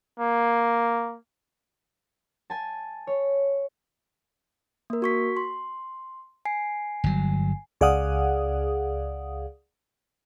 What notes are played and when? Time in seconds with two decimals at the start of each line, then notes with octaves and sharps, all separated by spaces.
0.19 A#3
2.50 G#5 A5
3.07 C#5
4.90 A#3 A#4
5.02 F#4 C#6 B6
5.37 C6
6.45 G#5 C7
7.04 G1 F#3
7.81 C#2 G#4 D5 F5 F#5 D#6